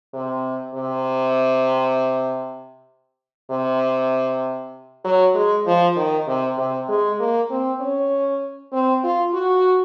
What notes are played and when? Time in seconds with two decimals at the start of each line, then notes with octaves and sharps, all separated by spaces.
0.13 C3
0.75 C3
3.51 C3
5.05 F#3
5.35 G#3
5.66 F3
5.96 D#3
6.28 C3
6.58 C3
6.89 G#3
7.19 A#3
7.50 C4
7.81 C#4
8.72 C4
9.04 F4
9.34 F#4